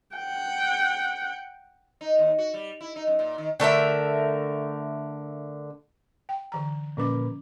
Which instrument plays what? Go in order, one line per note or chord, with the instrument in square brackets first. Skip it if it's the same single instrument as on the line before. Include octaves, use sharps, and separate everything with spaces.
[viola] F#5 G5
[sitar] D#4
D#2
F#4
G3
E4
D#4
F#2
A#2
D#3
[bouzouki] D3 A3 A#4 E5
[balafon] G5
D3 E3 A#5
[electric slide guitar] A#2 A#4 B4 [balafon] F3 C#4 D6